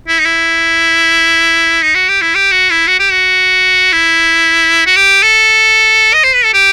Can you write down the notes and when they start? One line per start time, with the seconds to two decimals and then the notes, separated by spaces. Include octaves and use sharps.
0.08 E4
0.20 D#4
0.26 E4
1.83 D#4
1.95 F#4
2.09 G4
2.22 E4
2.35 G4
2.52 F#4
2.70 E4
2.88 F#4
3.00 G4
3.12 F#4
3.92 E4
4.86 F#4
4.96 G4
5.23 A4
6.14 D#5
6.24 C5
6.35 B4
6.45 A4
6.54 G4